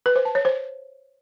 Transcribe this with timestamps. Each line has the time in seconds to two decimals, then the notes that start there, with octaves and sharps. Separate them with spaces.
0.06 B4
0.16 C5
0.25 A5
0.35 C#5
0.45 C5